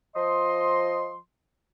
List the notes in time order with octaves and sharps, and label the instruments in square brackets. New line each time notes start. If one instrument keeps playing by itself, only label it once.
[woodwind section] F3 D#5 C6